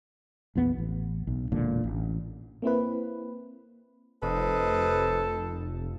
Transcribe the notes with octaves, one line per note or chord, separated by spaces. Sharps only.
A#1 E2 B3
A1
B1
E1 A#2 D3
A1
A#3 C4 E4 B4
F1 A4 B4 C5 D#5